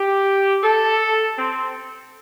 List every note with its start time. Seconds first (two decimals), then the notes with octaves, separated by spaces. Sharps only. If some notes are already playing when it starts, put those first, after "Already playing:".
Already playing: G4
0.62 A4
1.37 C4